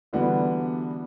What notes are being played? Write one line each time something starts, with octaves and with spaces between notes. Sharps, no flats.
D3 E3 G3 B3 D4 F#4